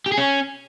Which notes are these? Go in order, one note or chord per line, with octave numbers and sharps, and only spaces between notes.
G4
G#4
C#4